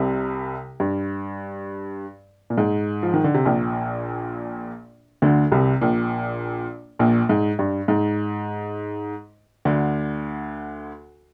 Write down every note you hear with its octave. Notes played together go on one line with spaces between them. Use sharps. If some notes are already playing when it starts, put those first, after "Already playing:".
Already playing: C2 C3
G2
A#2
G#2
F3
D#3
D3
C3
A#1 A#2
D2 D3
C2 C3
A#1 A#2
A#1 A#2
G#2
G2
G#2
D2 D3